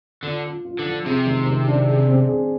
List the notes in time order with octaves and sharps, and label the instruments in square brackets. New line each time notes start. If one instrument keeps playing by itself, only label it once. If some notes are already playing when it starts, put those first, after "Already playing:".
[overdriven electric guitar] D3 [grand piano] F4
[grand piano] F4
F4
[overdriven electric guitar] D3
[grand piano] F3
[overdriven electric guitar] C3 [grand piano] G#4
[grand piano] D#3
D#3
D4
G#4
C4
G#4